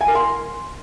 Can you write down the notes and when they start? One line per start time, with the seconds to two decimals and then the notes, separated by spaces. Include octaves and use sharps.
0.01 G#5
0.08 A#4
0.15 C6